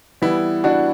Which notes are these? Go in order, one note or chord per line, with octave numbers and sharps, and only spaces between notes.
E3 G3 B3 E4
D4 F#4